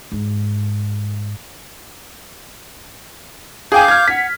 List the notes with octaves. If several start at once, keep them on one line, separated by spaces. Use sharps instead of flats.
G#2
G#4 F5 G5 G#5 D6 G6
F6 G#6
F#5 B6